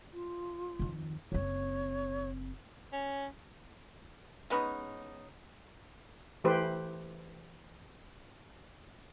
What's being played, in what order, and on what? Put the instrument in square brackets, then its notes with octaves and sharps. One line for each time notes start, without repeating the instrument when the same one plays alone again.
[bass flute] F4
[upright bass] F2 D#3
[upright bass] F#1 C4 [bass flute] C#5
[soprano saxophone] C#4
[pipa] G#3 B3 C#4 D#4
[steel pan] E3 A3 G4 B4 C5